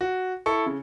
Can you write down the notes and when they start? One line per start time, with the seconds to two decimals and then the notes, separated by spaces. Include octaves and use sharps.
0.01 F#4
0.46 E4 A4 C#6
0.66 C#3